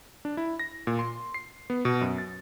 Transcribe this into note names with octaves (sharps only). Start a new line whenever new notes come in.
D4
E4
A#6
A#2
C6
C7
B3
B2
F#2
A6